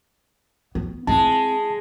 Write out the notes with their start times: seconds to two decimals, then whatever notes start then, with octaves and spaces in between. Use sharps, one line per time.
0.75 B3
1.07 G#3 C4 E4 A5